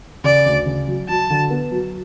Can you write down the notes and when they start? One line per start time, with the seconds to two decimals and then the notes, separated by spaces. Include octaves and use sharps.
0.24 C#3 D5
0.46 D2
0.66 C#3
0.88 F#3
1.09 F#3 A5
1.30 D3
1.51 B3
1.72 F#3